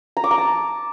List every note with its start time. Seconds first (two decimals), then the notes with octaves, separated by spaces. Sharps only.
0.17 A#5
0.24 D6
0.31 A#5
0.38 A5